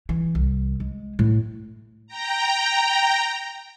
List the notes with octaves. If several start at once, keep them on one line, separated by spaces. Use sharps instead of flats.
E3
C2
G#3
A2
G5 A#5